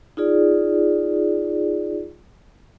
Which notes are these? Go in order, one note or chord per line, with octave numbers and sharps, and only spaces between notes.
D#4 F4 G#4 D5